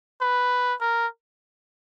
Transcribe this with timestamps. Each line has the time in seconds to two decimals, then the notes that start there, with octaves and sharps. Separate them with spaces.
0.21 B4
0.80 A#4